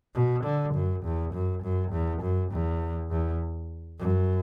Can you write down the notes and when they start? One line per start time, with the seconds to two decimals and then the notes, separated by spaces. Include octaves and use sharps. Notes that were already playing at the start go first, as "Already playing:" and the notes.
0.15 B2
0.44 D3
0.74 F#2
1.04 E2
1.34 F#2
1.63 F#2
1.92 E2
2.22 F#2
2.52 E2
3.11 E2
4.00 F#2